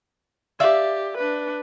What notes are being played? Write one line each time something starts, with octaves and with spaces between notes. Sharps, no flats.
G4 D5 E5 F5
D4 B4